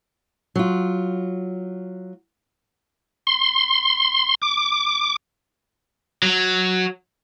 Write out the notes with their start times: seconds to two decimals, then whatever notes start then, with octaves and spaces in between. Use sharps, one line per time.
0.56 F#3 F4
3.27 C6
4.42 D6
6.22 F#3